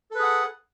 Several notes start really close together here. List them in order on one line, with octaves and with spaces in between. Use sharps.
A4 B4 G#4 F#5